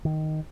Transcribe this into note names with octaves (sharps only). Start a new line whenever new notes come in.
D#3